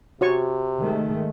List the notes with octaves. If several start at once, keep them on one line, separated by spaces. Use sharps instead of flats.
C3 F#4 C#5 C#6
D#3 G#3 A3